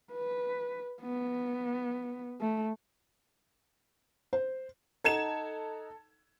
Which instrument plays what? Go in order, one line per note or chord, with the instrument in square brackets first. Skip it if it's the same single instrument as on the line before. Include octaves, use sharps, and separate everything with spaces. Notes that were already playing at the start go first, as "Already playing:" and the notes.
[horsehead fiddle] B4
B3
A3
[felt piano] C5
[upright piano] D#4 F#5 A#5 [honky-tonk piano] A4 G#6 E7